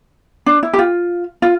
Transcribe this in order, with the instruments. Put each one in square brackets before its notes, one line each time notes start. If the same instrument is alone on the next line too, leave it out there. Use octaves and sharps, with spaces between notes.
[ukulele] D4
E4
G4
F4
F4